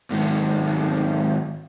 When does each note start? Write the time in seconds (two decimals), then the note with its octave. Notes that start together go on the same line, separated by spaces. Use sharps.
0.10 G#2 D#3 F#3